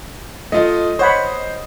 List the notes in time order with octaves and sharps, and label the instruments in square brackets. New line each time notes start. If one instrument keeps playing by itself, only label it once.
[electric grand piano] A3 F4 [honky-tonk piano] D#5
[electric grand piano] C5 [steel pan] C#5 F#5 B5